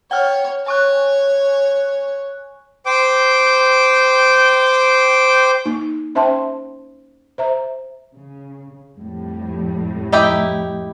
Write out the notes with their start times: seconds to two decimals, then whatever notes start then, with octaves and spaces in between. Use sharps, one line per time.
0.11 C#5 F#5 G5 F6
0.66 C#5 G#5 C#6 F#6
2.86 C5 G5 D6
5.65 A#3 D#4
6.15 C#4 C5 E5 G5 A5 C6
7.38 C5 E5 A#5
8.14 C#3
8.99 F2 A2 G3
10.12 D#4 E4 G4